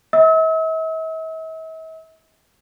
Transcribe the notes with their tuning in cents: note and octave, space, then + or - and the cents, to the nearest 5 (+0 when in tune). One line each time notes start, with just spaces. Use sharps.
E5 -45 E6 -40